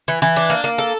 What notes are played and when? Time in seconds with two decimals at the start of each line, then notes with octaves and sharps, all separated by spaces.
0.08 E3
0.22 E3
0.36 D4
0.50 A#3
0.64 A#3
0.78 A4